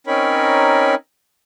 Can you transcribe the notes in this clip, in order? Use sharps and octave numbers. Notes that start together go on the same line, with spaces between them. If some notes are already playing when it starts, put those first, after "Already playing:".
C4 C#4 D#4 A#4 C#5 B5